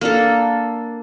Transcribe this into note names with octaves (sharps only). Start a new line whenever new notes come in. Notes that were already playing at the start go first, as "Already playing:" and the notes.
A#3 D4 A4